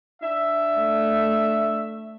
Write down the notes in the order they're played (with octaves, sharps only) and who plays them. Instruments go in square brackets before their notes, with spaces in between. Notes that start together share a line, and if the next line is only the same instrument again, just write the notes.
[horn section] D4 E5
[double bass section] A3